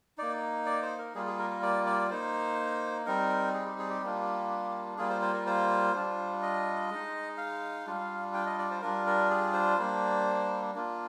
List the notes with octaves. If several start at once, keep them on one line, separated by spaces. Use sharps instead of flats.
A#3 D#4 D5
D5
C5
A#4
G3 A#3 F4 G#4
G#4
A#4
A#4
D5
D5
A#3 D#4 C5
G3 C4 D#4 A#4
G#4
G4
G#4
G4
G3 A#3 D4 F4
G3 A#3 F4 G#4
C5
C5
A#4
C5
G3 D4 F4
D#5
G#3 D#4
F5
G3 D4 F4
G5
D#5
D5
C5
G3 D4 F4 A#4
A#4
G#4
C5
G3 A#3 D4
A#3 D4 F4